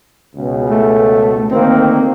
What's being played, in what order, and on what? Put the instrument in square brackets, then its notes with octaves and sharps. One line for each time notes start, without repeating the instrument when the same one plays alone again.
[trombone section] C#2 B2
[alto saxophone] A3
[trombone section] D2 D#3 A#3 [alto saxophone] C4